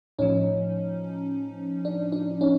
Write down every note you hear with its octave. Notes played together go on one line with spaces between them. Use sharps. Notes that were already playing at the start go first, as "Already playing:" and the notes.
A2 F3 C#4 D#4
D4
D4
C#4 D#4